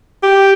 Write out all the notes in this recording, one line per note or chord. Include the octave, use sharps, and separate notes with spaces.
G4